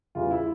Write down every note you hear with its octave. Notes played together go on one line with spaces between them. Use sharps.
E2 C#3 E3 G3 F4
E4